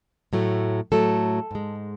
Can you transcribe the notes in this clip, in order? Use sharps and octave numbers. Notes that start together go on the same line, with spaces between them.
A2 F#3 A3
A2 F#3 A3 A4
G#2 G#3